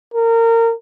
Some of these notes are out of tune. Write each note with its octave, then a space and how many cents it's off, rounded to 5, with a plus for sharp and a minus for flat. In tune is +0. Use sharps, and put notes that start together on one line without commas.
A#4 -25